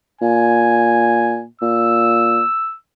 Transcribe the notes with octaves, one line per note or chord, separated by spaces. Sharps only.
A#2 G#5
A#2 E6